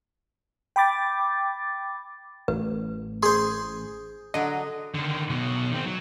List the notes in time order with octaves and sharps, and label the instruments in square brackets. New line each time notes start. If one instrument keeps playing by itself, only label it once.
[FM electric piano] G5 B5 D6 A6
[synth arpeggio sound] A1 [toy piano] B4
[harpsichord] G#4 C5 [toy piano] C6
[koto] D3 F#3 [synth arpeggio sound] D#5
[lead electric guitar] D3 D#3
B1 B2
D#3 C4
F#3